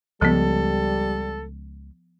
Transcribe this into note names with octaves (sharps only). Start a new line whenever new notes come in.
C#2 F3 G3 B3 A4